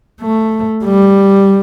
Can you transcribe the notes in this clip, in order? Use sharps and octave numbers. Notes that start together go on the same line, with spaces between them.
A3
G3